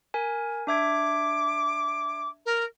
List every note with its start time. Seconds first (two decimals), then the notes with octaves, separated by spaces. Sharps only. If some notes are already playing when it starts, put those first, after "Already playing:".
0.14 A#4 G#5
0.67 D4 E5 D6 G#6
2.45 A#4